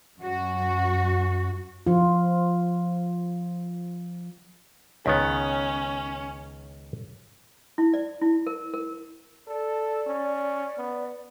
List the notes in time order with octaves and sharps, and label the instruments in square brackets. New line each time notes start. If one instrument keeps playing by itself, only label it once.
[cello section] F#2 F#4
[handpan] F3 F4
[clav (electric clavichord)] C#2 D#3 B3 [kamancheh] C#4
[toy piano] E4
D5
E4
A#4
A#4
[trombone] A4 [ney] D5
[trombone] C#4
B3